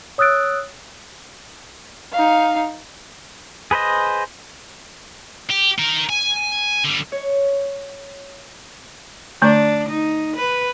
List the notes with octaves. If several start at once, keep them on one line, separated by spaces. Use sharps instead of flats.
C#5 D#6 E6 F#6 A6 D7
D#4 F5
G#4 B4 C5 D#5
G4
D#4 A#4
G#5
D3 G3
C#5
D3 A3 D4 A#5
D#4
B4